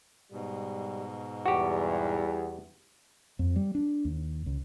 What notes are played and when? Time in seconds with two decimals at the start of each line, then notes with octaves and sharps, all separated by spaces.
0.32 G#2 B2 G3
1.46 E2 G3 F#4 G4
3.39 F2
3.56 G3
3.75 D4
4.05 D#2
4.46 C#2